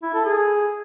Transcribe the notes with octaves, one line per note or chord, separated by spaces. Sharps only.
E4
A4
G#4